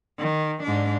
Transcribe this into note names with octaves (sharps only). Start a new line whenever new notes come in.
D#3
G#2 D4